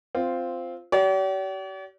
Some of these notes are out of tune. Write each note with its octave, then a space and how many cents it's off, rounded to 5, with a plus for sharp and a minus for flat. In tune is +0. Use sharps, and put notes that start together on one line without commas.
C4 -5 F4 +0
G4 -45 D5 -45